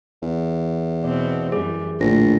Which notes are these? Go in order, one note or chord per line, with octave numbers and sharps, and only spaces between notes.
E2
B2 C4 D5
F#2 E3 G3 G#4
A#1 A2 D3 F4 A#6